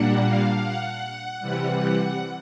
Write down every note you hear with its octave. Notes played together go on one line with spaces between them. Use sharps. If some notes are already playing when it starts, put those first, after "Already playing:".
Already playing: A#2 G3 A#3 D4 F#5
F5
F#5
C3 E3 G3 F#5